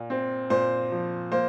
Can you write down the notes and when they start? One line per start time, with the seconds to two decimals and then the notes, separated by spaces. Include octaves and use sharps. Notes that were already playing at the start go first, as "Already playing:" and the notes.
Already playing: A#2
0.10 C4
0.50 A#2 C5
0.92 F3
1.32 A#3 C5